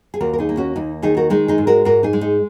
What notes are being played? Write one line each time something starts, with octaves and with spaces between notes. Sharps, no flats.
G#4
D#2 F#4 A#4
A#4
D#4 G#4
A#3
C#4 F#4
D#2 D#4
D#3 D#4 G#4
F#4 A#4
G#3 D#4 G#4
D#4 G#4
G#2
F#4 A#4
G#2 F#4 A#4
D#4 G#4
G#3
D#4